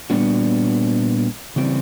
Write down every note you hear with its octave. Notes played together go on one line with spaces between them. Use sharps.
A#2 G3 B3 D4 F#4
C#3 E3 G3 C4